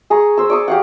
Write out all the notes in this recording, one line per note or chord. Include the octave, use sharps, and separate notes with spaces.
G#4 G#5 A#5 C#6
C5 E6
D5 C#6 D#6
G4 F5 F#5